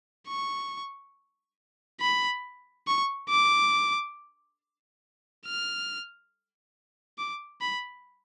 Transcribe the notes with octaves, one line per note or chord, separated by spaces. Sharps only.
C#6
B5
C#6
D6
F6
D6
B5